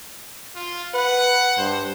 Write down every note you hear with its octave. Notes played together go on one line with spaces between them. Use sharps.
F4
B4 F#5
G2 C5